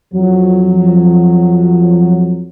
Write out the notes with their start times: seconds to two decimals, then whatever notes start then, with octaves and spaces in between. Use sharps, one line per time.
0.14 F2 F#3